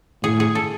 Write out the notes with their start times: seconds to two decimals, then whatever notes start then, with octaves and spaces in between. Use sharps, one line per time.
0.23 A2 G#4
0.40 G#4
0.55 A4